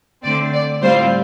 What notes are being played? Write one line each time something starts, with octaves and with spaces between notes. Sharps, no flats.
D3 A3 C4 D5
D5
A2 G3 C4 F4 C5